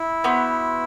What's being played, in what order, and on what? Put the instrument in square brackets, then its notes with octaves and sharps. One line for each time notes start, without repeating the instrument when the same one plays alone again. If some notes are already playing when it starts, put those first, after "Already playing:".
Already playing: [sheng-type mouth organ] E4
[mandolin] B3 F#4 C5